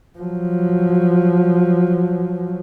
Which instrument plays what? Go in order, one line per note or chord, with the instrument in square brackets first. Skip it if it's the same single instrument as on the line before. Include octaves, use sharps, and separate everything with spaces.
[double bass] F3 F#3